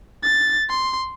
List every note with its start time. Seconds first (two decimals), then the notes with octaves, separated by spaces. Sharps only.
0.23 A6
0.69 C6